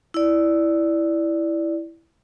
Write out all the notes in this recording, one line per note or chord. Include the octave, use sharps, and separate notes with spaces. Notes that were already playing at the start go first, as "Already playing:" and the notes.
E4 D5